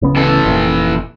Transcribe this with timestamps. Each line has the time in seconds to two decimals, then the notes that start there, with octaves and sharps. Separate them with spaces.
0.02 D1 C#3 B3
0.16 E3 A4
0.44 F1 A#2